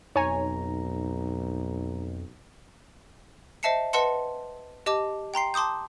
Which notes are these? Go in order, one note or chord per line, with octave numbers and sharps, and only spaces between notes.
B1 F2 D#4 C#5 G#5 A#5
C5 D#5 E5 A5 C7 C#7
B4 D#5 F#5 A5 C6 C#7
G4 D#5 A5 D6
G5 A#5 C6 C7
A5 C6 D6 D#6 G6